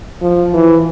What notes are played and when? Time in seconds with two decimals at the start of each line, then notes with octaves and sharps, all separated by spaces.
0.22 F3
0.53 E3